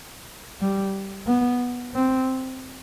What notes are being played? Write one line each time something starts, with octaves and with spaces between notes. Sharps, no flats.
G3
B3
C4